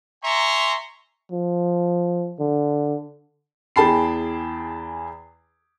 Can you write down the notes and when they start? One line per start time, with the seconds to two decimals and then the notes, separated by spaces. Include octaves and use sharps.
0.23 E5 G#5 A#5 C6 C#6
1.32 F3
2.40 D3
3.76 E2 G#4 G5 A5 B5 C7